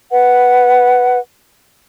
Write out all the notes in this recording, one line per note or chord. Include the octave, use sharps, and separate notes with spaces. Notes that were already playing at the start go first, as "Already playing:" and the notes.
B4 F#5